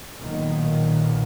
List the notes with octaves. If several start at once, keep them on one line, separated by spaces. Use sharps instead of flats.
B1 A#2 D#3